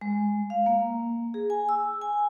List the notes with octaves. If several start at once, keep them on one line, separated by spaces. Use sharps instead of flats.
G#3
F5
A#3
G#4
G#5
E6
G#5